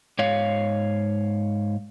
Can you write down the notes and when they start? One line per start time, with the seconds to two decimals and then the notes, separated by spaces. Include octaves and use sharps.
0.19 G#2 C#5 F5